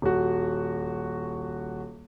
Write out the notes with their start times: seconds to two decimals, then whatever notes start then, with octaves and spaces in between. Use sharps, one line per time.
0.02 D#1 F#4